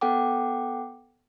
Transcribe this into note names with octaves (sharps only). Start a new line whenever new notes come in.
B3 A4 F#5 G5 D6